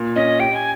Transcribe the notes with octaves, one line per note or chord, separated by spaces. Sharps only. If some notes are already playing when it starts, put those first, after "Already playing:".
Already playing: A#2
C#4 D#5
G4 G5
G#5